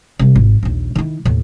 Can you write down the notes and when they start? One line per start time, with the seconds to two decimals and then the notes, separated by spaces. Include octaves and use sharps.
0.19 C3 G3
0.36 G#1
0.63 A#1 D#2
0.95 D#3 E4
1.25 D#2 A2